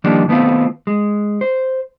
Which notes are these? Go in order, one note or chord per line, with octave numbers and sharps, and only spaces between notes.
D#3 F3 G3 A#3 D4
D#3 A3 B3 C4 F4
G#3
C5